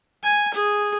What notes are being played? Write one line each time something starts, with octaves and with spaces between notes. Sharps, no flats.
G#5
G#4